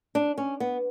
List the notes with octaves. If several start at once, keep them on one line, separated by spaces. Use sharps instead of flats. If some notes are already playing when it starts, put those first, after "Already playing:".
D4
C#4
B3